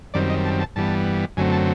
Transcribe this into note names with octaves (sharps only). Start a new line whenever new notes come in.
F#2 D#3 G3 C4 D5
D#5
A5
A5
G2 E3 G3 B3 A5
F#2 D3 F#3 A3 C4 G#5
A5